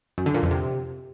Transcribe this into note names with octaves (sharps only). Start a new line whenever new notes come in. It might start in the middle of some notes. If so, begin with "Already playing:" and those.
F#2
D3
A#2
F2
C3